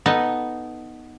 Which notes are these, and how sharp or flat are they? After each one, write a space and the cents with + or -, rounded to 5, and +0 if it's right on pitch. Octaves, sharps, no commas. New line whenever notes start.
B3 +0 D#4 +0 A4 +0